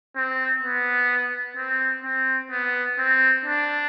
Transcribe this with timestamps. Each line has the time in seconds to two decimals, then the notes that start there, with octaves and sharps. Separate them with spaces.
0.16 C4
0.62 B3
1.57 C4
2.04 C4
2.51 B3
2.99 C4
3.45 D4